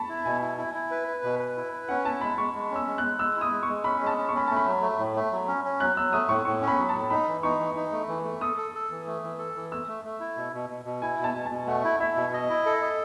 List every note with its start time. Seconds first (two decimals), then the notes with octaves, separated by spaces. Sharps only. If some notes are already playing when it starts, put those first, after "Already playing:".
Already playing: A5 B5 C#6
0.09 E4
0.25 B2 G#5
0.41 E4
0.58 E4
0.74 E4
0.91 B4
1.08 B4
1.24 B2
1.39 B4
1.57 E4
1.73 B4
1.89 C#4 F#5
2.05 E4 A5
2.21 G#3 B5
2.38 G#3 C#6
2.54 G#3
2.71 C#4 E6
2.87 G#3
2.98 F#6
3.04 G#3
3.19 G#3 E6
3.36 E4
3.41 D#6
3.51 G#3
3.63 C#6
3.69 G#3
3.84 C#4 B5
4.01 G#3
4.07 A5
4.18 C#4
4.29 C#6
4.34 C#4 B5
4.47 A3 A5
4.56 B5
4.66 F#3
4.82 A3
4.99 A2
5.16 A3
5.32 F#3
5.48 C#4
5.65 C#4
5.80 F#3 F#6
5.96 F#3 E6
6.13 A3 D#6
6.29 A2 C#6
6.45 A2 C#6
6.62 C#4
6.68 B5
6.79 F#3
6.89 A5
6.94 A2
7.10 D#4 B5
7.28 E3
7.43 D#4 C#6
7.59 E3
7.76 D#4
7.92 A3
8.08 E3
8.25 A3
8.41 A4 D#6
8.57 A4
8.75 A4
8.91 E3
9.07 A3
9.23 E3
9.39 A4
9.56 E3
9.71 A3 E6
9.88 A3
10.05 A3
10.20 E4
10.37 B2
10.53 B2
10.70 B2
10.85 B2
11.02 E4 G#5
11.19 B2 A5
11.35 B2
11.46 A5
11.51 B2
11.67 A3 F#5
11.84 E4
12.00 E4 E5
12.16 B2
12.33 D#5
12.50 E4
12.66 A4
12.82 D#5